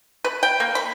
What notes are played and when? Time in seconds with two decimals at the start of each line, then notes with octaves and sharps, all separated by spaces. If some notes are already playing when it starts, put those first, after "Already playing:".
0.24 B4
0.43 G5
0.60 A#3
0.75 B5